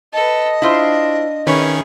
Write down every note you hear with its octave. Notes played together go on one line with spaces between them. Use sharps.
A4 B4 D#5
D4 E4 F4 C5
D#3 C#4 E4 G#4 B4 C#5 C#6